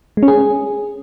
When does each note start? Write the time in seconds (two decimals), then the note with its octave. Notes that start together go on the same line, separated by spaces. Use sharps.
0.17 G#3
0.23 C#4
0.28 G#4